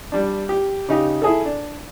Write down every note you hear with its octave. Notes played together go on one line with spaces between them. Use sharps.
G3 D4
G4
C#3 D#4 G4
E4 G#4 A4
D4